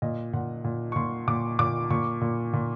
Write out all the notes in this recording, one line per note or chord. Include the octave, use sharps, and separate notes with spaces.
A#2 D#5
A#2 F#5
A#2
C#6
A#2 C6
A#2 D6
A#2 D6
A#2 C#6
A#2
A#2